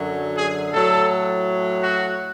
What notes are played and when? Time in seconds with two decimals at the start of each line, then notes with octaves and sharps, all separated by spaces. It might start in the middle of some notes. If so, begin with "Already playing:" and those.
Already playing: F#2 D3 F#3
0.36 G#4
0.72 A2 F#3 A4
1.83 F#4